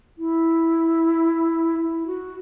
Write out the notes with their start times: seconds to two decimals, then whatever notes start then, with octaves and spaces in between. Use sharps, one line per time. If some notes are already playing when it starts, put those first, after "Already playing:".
0.18 E4
1.79 E4
2.06 F#4